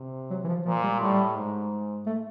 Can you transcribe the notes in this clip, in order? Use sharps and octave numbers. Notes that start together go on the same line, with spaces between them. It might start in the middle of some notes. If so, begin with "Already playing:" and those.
Already playing: C3
F#3
E3
F3
A#2 F3
G3
A2 G3
G#2
A3